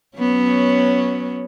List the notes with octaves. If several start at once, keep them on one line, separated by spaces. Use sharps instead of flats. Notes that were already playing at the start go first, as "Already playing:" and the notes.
F#3 B3 C#4